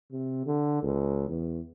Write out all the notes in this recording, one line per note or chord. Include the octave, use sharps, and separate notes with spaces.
C3
D3
C#2
E2